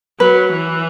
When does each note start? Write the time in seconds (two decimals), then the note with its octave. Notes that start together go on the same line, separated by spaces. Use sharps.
0.20 F#3 B4
0.51 E3